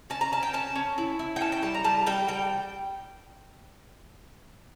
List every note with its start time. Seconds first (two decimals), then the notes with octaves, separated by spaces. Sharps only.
0.10 C#4 A5
0.21 A#5
0.32 C#4 A5
0.43 G5
0.53 C#4 A5
0.76 C#4
0.98 E4
1.19 E4
1.36 G5
1.41 C#4 A5
1.52 G5
1.63 G3 A5
1.74 A#5
1.84 G3 A5
2.06 G3 G5
2.28 G3 G5